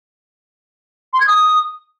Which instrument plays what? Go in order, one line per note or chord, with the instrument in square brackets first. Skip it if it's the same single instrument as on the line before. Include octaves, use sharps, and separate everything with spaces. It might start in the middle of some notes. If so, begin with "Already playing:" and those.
[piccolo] C6
G#6
D#6